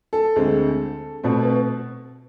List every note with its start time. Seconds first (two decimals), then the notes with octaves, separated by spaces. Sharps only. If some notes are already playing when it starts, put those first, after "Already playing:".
0.13 A4
0.36 D2 D3 G#3 C4
1.24 B2 A3 C4
1.43 B4